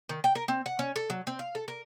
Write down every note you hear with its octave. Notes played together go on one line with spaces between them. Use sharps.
D#3
G5
A#4
C4
F#5
C#4
A4
F#3
C4
F5
A4
A#4